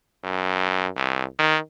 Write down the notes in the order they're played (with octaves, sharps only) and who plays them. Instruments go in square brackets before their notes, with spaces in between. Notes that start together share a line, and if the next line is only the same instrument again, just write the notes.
[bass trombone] F#2
C2
D#3